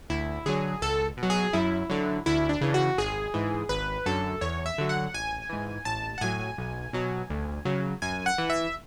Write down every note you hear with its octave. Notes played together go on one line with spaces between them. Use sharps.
D2 E4
D3 F#3 G#4
C#2 A4
B2
F#3
G#4
F#2 E4
D3 F#3
D2 E4
D4
C#3 E3
F#4
G#1 G#4
G#2 E3
G#1 B4
F#2 D3 F#3 A4
E2 C#5
E5
D3 F#3
F#5
A1 G#5
G#2 E3
A1 A5
F#5
A2 F#3 G#5
B1
B2 F#3
D2
C#3 F#3
F#2 G#5
F#5
E3
E5